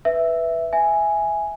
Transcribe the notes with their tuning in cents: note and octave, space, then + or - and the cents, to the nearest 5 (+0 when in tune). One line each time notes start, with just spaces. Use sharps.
B4 +0 E5 +0
E5 +0 G#5 +0